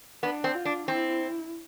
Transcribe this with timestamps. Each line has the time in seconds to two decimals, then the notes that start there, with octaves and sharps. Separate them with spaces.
0.23 B3 D4
0.44 C4
0.55 F4
0.65 D4
0.88 C4 E4